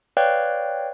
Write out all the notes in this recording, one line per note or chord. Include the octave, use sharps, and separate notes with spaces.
B4 C#5 D5 F5 G5 F#6